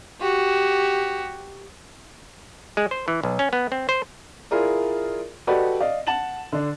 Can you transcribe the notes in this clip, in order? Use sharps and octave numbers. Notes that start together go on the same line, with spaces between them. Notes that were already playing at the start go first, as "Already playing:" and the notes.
F#4 G4
G#3
C5
E3
B1
C#4
B3
C4
C5
E4 F4 G#4 A#4 D5
F#4 G4 A4 B4 D5 D#5
D5 D#5 F5
F#5 A5 A6 E7 F#7
D3 D4